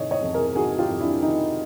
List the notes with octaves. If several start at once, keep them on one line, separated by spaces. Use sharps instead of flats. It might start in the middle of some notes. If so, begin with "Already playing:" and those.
Already playing: F2 C3 D#3 C#5 D#5
C#5 D#5
F2
G#4 A#4
D#3 F#4 G#4
F4 G4
F2
D4 E4
D#3 D#4